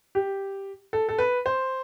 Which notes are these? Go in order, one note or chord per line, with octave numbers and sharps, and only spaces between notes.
G4
A4
A4
B4
C5